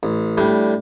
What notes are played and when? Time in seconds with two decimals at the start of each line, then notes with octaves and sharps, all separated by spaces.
0.03 A1
0.38 A2 G3 D4